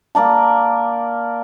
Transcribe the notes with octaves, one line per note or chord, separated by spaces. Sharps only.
A#3 A#4 D5 A5